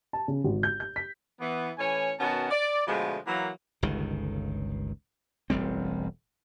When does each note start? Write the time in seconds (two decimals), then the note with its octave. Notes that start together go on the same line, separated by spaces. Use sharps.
0.13 A5
0.28 C#3
0.44 G#1
0.63 G6
0.80 G6
0.96 B6
1.40 E3 B3
1.78 A2 E3 C#4 C#5 G#5
2.20 B2 D#3 B3 C#4 F#4 A5
2.51 D5
2.87 B2 D3 F3 G#3 A3 B3
3.27 E3 F#3 A#3
3.83 G1 C#2 D#3
5.50 E1 A1 G3 C4